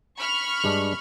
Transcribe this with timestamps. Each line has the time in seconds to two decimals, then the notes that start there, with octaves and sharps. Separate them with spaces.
0.16 B5 C#6 F6
0.64 G2 G#3 D4